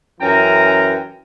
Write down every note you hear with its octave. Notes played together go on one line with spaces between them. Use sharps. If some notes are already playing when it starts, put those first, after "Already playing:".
F#2 E3 C#4 G5 A#5